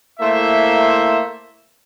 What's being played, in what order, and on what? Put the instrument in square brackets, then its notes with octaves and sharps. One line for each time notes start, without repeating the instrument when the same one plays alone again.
[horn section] A3 A#3 E4 C5 E5